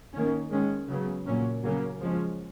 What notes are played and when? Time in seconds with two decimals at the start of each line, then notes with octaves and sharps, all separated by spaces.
0.14 D#3 A#3 C#4
0.51 D#3 G#3 C#4
0.89 C#3 F#3 B3
1.26 A#2 F#3 A#3 C#4
1.64 C#3 F#3 A#3 C#4
2.01 F3 G#3 C#4